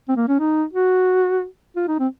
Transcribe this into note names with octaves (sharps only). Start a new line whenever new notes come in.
C4
A#3
C#4
D#4
F#4
F4
D#4
C4